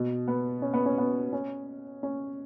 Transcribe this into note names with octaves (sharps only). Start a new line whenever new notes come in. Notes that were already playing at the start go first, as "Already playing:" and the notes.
Already playing: B2
B3
C#4
B3
C#4
B3
C#4
C#4